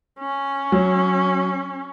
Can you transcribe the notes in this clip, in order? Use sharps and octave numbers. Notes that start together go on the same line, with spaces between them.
C#4
F#3